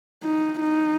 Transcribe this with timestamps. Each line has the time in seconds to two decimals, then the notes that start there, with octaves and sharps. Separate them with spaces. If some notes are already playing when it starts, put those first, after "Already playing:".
0.23 D#4
0.60 D#4